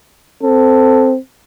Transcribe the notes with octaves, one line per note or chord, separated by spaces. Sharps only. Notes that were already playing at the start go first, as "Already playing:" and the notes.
C4 A4